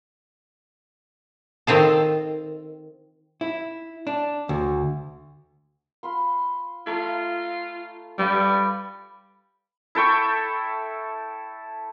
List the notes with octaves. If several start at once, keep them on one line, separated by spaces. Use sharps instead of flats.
D#3 C4 F4 A4
E4
D4
D2
F4 B5 C6
A3 F4 A#5
G3 B4 F5 G5
E4 A4 G5 C#6